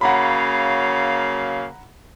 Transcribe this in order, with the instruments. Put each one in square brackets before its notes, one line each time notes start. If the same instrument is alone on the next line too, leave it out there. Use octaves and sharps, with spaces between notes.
[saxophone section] C#3 F#3 A#3 [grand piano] F#5 A#5 B5